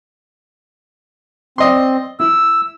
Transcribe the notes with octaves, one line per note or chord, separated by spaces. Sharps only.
C4 D5 D#5 C6
E4 E6